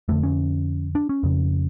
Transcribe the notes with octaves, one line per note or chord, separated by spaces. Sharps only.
F2 D3 A3
C#4
D4
C#4
F2 C#3